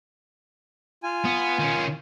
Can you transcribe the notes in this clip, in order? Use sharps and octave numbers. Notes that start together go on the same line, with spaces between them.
F4 G#5
B3
D#3 C#4